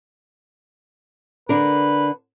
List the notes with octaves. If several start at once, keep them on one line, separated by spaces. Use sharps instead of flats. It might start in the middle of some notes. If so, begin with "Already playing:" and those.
D3 D4 A#4 B4